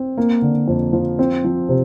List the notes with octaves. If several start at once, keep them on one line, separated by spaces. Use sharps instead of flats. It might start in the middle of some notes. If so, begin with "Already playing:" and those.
Already playing: C4
A#3
D3
F2
F3
C4
F3
C3